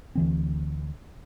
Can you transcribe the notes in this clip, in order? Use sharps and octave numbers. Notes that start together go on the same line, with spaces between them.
D2 E3 C4